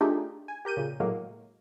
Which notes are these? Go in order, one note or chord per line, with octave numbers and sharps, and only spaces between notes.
A3 D4 D#4 F4 G4 G#4
G#5
G4 A#4 G6 D#7
A#2 C#3
A2 F#3 G#3 A#3